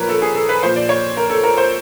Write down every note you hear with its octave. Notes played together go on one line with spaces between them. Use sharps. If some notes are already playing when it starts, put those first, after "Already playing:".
Already playing: A#2 F3 A#4 B4 C#5
A4
G#4
A4
B4
A#2 F3 C5
D5
C#5
A#4
A4
A#4
C5